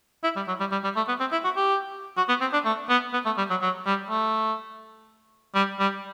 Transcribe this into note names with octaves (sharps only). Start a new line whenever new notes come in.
E4
G3
F#3
G3
G3
G3
A3
B3
C4
E4
F#4
G4
F#4
B3
C4
D4
A3
B3
B3
A3
G3
F#3
F#3
G3
A3
G3
G3